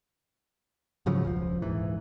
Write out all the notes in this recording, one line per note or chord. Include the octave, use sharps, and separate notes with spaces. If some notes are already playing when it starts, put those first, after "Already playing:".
G#2 C#3 F3 F#3
E1 C#2 F3
D#1 G#2 E3